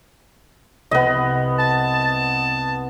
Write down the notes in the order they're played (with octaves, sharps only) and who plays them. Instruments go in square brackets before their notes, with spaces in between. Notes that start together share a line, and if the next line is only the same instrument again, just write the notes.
[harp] C2 [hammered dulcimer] B3 D#5
[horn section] A5